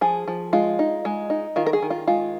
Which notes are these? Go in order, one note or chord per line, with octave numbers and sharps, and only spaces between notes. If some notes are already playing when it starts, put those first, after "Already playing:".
F3 G#4
F3
G#3 F4
D#4
G#3
D#4
D#3 F4
A#4
G#4
D#3
F4
G#3 F4